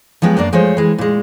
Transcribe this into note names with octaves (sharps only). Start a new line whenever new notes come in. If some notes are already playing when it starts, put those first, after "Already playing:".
F3 F#3 G#3 B3 G4
F#2 A#3 D4 D5
F3 G#3 A3 C5 C#5
E3 G#3
A#2 G#3